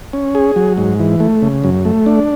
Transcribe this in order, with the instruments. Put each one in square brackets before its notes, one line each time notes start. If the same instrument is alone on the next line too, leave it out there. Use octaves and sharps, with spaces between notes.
[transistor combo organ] C#4
G#4
F#3
G#2
E3
A3
C#3
F#2
A3
D4